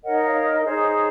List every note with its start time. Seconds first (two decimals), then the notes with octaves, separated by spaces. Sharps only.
0.04 D#4 A#4 C#5 D#5 F#5
0.24 C#5 F5
0.44 D#5
0.65 D#4 G#4 C5 C#5
0.81 C#5